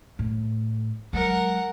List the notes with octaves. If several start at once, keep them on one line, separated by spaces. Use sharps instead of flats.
A2
F#3 G#3 A#4 F#5